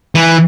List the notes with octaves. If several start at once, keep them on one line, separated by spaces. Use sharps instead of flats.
E3